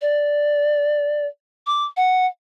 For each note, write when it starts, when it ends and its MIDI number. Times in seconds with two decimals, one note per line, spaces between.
0.02 1.26 74
1.67 1.85 86
1.97 2.26 78